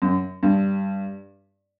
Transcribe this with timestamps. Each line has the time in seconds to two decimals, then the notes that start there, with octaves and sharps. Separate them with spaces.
0.02 F#2
0.43 G2